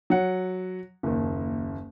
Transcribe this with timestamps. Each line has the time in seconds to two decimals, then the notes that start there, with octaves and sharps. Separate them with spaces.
0.10 F#3 F#5
1.03 F#1 D#2